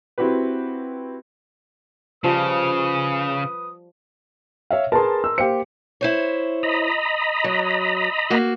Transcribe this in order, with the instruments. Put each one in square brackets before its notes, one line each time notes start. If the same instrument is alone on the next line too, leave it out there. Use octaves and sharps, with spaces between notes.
[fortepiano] C4 E4 F#4 G4 B4
[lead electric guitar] C#3 [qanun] F3 G3 D#5 [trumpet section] B4 D#6
[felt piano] C#5 E5 F5
[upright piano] G#4 B4 A5 [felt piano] A#4 C6
[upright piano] E6
[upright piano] A#3 F5 C#7 [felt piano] G4 C5
[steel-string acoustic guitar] E4 C5 C#5
[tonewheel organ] D#5 A#5 B5
[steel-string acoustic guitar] F#3
A#3 F#4